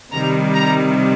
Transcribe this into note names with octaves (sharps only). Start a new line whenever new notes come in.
C3 D#3 G3 A#5
A#5